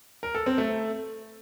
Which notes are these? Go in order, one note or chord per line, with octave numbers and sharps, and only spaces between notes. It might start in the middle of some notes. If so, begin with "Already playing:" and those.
A#4
A4
C4
A3